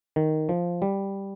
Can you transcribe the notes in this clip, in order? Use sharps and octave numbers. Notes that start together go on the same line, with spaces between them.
D#3
F3
G3